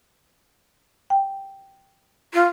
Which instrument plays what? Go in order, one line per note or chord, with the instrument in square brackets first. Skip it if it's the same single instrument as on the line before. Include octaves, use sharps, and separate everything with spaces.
[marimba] G5
[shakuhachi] F4